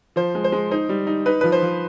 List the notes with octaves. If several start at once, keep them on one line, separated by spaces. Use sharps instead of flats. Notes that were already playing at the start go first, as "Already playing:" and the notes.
F3 C5
G#3
C5
G#3
D#4 C5
G3
D#4
D#4 B4
F3 B4
C5
F3